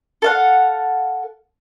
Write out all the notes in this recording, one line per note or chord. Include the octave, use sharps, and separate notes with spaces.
A4 F5 F#5